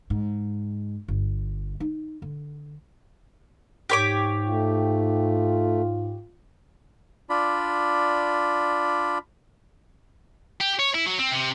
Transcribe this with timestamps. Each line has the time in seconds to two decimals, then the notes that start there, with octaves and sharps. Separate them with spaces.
0.10 G#2
1.08 G1
1.80 D#4
2.22 D3
3.89 G#2 G4 C#5 D6
4.48 A3 F4
7.30 D4 F4 D5 B5
10.60 G4
10.79 C#5
10.94 E4
11.06 F#3
11.19 C4
11.32 C3